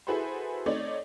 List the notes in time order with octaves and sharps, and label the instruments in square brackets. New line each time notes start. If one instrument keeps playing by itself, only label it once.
[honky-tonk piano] E4 F#4 G#4 A4 B4 C5
A3 C4 D#4 C#5 D5